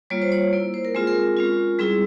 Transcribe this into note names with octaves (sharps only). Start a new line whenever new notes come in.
G3 A#3 F4 C#5
C5
C#5
A#3 E4
C5
A#4
G#3 C4 F4 G#4
A#4
G#3 C#4 F4
G3 C4 E4 G#4